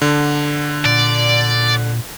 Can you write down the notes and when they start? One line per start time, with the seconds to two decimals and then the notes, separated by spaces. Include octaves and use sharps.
0.02 D3
0.85 A#2 D5